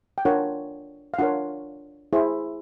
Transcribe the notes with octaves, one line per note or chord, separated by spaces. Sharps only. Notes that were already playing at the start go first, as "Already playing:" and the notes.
G5
D4 F4 A#4 C#5 F#5
F5
D4 F4 A#4 C#5 F#5
E4 G#4 C5